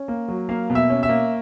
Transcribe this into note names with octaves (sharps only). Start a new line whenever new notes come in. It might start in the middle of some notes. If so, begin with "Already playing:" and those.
Already playing: C#4
A#3
F#3
A#3 F5
B2
E5
C#4
E5
A#3